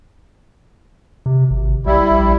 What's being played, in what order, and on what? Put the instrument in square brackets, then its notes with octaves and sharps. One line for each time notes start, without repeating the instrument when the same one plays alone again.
[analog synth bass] C3
G#1
[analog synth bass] B1 [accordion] G3 E4
[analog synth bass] A#1